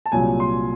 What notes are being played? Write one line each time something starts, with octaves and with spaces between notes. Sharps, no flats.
A5
C2 A#2 F#3 G#5
C6